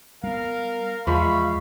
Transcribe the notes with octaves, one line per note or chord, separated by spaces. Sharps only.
G3 B3 A#4 F5
E2 F3 G#3 E5 F5 B5 C#6